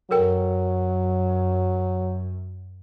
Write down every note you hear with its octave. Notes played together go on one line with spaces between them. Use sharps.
F#2 F#3 A4 A#4 G5